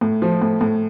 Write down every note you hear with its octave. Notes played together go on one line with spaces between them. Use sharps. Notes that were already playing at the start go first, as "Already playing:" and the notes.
A2
F3
A2
A2